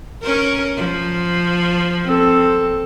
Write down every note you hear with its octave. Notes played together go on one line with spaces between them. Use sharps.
C#4 A#4
F3
C4 A4